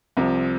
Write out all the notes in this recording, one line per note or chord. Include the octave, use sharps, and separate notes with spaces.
C2 C3 F3